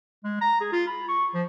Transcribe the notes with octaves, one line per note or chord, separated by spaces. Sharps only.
G#3
A#5
G#4
F4
B5
C#6
F3